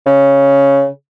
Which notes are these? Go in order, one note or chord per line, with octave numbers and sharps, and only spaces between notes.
C#3